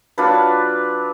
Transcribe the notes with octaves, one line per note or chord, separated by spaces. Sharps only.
F#3 D4 F4 B4